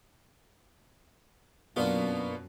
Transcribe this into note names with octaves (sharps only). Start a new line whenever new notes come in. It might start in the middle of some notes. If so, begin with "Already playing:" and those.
F#2 B2 A#3 B3 D4 F4